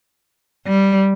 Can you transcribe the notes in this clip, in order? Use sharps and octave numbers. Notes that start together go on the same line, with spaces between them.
G3